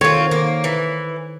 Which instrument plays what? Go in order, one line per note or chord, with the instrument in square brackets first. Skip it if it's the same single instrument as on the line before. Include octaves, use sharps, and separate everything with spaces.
[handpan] D#3 A4 C5 [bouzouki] C4 F4 [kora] C#5
[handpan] D#3 [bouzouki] A#3
[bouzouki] E3